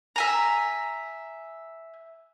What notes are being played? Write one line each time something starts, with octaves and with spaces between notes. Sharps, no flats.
E5 G#5 A#5